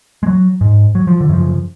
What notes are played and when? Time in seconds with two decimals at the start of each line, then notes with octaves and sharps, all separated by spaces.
0.23 G#3
0.26 F#3
0.61 G#2
0.95 F#3
1.07 F3
1.21 D3
1.29 F#2 C#3 F3